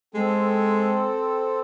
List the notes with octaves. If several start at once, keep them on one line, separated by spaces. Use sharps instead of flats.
G#3 C4 A4